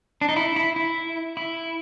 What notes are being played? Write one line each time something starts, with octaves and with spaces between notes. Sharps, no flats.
D4
D#4
E4
E4
E4
E4